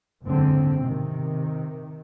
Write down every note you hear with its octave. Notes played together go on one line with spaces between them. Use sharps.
F#1 E2 G#2 D3 C4
C3 D#3